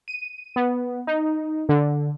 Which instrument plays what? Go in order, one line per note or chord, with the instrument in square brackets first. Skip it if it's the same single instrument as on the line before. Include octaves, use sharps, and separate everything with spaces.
[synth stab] D#7
B3
D#4
D3